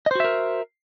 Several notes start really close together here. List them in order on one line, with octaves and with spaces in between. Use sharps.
D#5 C5 F#4 E5 A#4